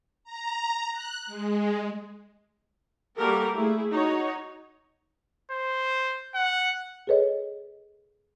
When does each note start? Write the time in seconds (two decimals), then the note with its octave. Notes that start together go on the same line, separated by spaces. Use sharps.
0.24 A#5
0.92 F#6
1.27 G#3
3.17 G3 A#3 F#4 G4 A4 A#4
3.56 A3 E4 G#4
3.91 D#4 F#4 C#5
5.52 C5
6.34 F#5
7.07 G#4 A4 B4 C#5 D#5